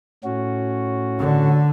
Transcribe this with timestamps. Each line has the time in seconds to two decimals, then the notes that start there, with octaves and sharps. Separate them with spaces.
0.24 A2 C#4 F#4
1.19 D3